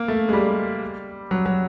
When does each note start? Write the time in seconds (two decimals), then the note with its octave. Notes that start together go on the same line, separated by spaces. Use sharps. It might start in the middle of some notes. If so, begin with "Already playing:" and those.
Already playing: A#3
0.08 A3
0.29 G#3
0.33 G3
1.31 F#3
1.46 F#3